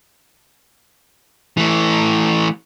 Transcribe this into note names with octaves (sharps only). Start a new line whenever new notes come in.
E3 A3